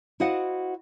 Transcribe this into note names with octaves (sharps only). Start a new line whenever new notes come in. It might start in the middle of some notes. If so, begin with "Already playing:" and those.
E4 F#4 C5 D#5 F5 F#5